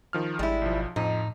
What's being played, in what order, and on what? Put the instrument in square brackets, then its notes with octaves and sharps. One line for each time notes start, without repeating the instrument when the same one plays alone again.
[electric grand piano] D#3 F3 F6
[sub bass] G#1 [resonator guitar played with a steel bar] G3 E4 [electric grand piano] G#3
[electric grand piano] B1 F3
[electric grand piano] F2 F3 [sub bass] A2 [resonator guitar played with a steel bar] D#4